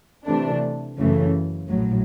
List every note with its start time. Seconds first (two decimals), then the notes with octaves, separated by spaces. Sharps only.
0.27 C3 E3 A3 D4
0.98 F#2 C#3 E3 A3
1.69 A#1 A2 F#3